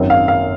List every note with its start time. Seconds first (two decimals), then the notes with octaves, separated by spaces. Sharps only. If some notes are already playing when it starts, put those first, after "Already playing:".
Already playing: G#1 F#2 D#3
0.10 F5
0.28 F5